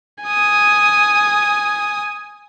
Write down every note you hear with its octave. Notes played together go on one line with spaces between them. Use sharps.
G#5 D#6